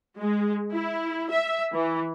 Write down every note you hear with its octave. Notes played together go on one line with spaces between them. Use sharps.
G#3
E4
E5
E3